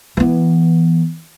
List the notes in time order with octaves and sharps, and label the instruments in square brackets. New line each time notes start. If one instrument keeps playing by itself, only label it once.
[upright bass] E3 B3